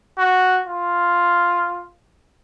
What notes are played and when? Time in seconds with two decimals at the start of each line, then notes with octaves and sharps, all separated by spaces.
0.18 F#4
0.67 F4